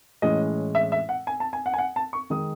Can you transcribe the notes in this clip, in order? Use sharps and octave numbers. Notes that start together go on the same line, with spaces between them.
A2 E3 G#3 C#4 D#5
E5
E5
F#5
G#5
A5
G#5
F#5
G#5
F#5
A5
C#6
D#3 G#3 D#6